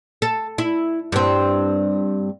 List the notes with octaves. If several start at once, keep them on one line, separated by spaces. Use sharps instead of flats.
A4
E4
G2 C4